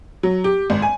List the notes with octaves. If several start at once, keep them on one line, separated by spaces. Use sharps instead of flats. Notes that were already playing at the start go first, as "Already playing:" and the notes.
F#3
G4
G#1
G#5